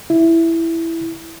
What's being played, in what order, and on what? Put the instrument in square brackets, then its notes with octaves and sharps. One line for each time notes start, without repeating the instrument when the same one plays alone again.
[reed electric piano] E4